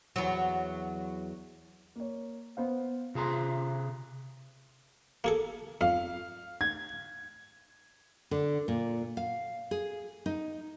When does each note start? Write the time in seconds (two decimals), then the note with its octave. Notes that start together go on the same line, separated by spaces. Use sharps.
0.16 E2 F#3
1.96 A#3 C#5
2.57 B3 C5 F5
3.15 C3 F4 G#4 A#5 C6
5.24 A#3 G#4 A4
5.81 F2 F5
6.61 G#6
8.31 D3
8.68 A#2
9.17 F5
9.71 G#4
10.26 D#4